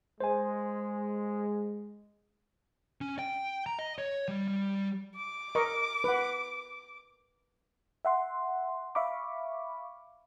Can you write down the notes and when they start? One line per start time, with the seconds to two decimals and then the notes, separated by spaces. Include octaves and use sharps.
0.20 G#3 C5 G#5
3.01 C#4
3.19 G5
3.66 A#5
3.79 D#5
3.98 C#5
4.28 G3
4.48 G3
5.16 D6
5.55 A#4 D#5 C#6
6.04 B4 F#5
8.05 E5 F#5 C6
8.95 E5 F5 B5 C#6 D6